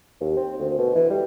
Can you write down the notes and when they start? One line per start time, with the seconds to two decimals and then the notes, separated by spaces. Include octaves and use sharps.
0.21 D#2
0.36 C4
0.59 D2
0.78 B2
0.95 E3
1.10 G3